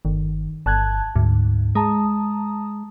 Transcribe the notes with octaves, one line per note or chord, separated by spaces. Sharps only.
G1 D#3
G1 A5 F#6 G#6
D2 G#2
G#3 A5 A#5 D#6